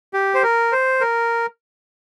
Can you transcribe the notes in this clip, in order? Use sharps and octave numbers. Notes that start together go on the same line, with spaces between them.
G4
C5
A#4
C5
A#4